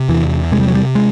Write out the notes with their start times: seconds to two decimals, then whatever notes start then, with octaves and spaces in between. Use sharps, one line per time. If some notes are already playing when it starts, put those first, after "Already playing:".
Already playing: C3
0.09 E2 E3
0.52 C3 G#3
0.60 G3
0.68 F#3
0.75 G3
0.95 G#3